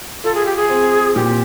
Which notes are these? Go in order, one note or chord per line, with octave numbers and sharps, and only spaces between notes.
F4 A4
G#4
G4
G#4
C4
A#2 G4